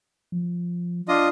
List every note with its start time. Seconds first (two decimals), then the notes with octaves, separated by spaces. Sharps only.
0.32 F3
1.08 D4 F4 D#5